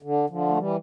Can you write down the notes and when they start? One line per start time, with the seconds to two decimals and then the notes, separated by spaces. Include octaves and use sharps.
0.03 D3
0.30 D3 F3
0.49 A3
0.57 E3 G3